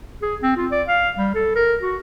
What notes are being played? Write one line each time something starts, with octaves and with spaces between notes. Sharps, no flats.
G#4
C4
F4
D5
F5
G3
A4
A#4
F#4